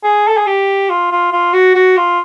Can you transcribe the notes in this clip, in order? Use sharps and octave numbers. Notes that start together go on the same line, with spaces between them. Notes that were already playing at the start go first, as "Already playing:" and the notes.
G#4
A4
G#4
G4
F4
F4
F4
F#4
F#4
F4